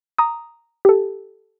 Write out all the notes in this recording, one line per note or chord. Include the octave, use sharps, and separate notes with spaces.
A#5 D#6
G4 A4